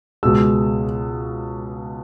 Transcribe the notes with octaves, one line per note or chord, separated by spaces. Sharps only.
C#2 B2 G#3 E6